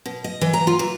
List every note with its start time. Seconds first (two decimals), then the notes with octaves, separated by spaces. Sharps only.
0.06 B2
0.24 D#5
0.41 E3
0.53 A#5
0.67 F4
0.79 E3